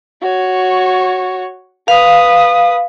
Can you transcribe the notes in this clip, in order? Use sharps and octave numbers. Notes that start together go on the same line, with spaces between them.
F#4 C#5
B4 F5 D#6